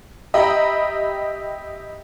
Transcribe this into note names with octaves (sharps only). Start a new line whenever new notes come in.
G4 D#5 E5 G5 A#5 B5